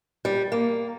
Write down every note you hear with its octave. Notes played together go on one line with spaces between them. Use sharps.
G3
A#3